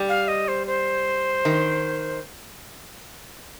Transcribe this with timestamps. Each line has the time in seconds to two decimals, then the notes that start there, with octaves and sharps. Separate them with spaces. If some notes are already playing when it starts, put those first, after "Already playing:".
Already playing: G3
0.09 F5
0.28 D#5
0.48 C5
0.67 C5
1.45 D#3